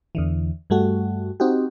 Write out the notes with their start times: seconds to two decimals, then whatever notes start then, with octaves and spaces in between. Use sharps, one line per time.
0.15 E2 D3 E3
0.70 G2 G3 A3 F#4
1.40 C4 D#4 F#4 G4